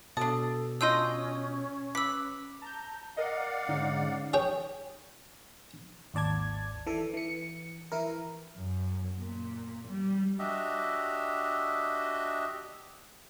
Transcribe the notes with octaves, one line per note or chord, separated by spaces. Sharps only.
B2 D4 A4 A5 D#6
C#4 D4 F4 D#5 E6 G6 D#7
B4 D6 E6 B6
A5 A#5 G6
A#4 D5 D#5 F5 F#5
G#2 D3 C#4 D#4
G#4 C#5 G5
G#1 D#2 D5 A5 G#6
E3 A4
E3 C#7
E3 E4 A#4
F#2
A#2
G3
D4 F#4 G4 D#5 E5